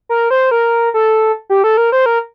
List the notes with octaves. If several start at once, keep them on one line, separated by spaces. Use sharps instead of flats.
A#4
C5
A#4
A4
G4
A4
A#4
C5
A#4